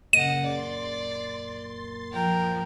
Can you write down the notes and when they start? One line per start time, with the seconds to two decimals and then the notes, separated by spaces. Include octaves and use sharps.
0.13 F#2 A#2 C#3 A#3 D#5 F#5 D#7
0.46 D5 C6 A6
2.12 F3 A#4 G5